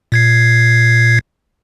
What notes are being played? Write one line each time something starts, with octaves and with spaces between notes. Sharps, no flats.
A#2 G#6 C7